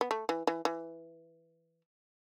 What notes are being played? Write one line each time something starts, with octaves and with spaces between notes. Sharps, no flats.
B3
A3
E3
E3
E3